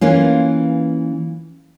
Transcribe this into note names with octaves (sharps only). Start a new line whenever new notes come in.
E3 A#3 C#4 F4